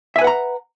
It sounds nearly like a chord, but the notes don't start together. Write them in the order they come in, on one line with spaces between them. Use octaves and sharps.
E5 G#5 B4 F#5 A#5